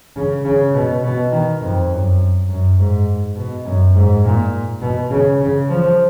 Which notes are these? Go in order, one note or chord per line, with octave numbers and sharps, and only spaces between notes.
C#3
C#3
B2
B2
D#3
F2
F#2
F#2
G#2
B2
F#2
G#2
A#2
B2
C#3
C#3
F3